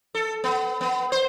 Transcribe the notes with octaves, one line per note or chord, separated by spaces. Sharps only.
A4
B3
B3
C5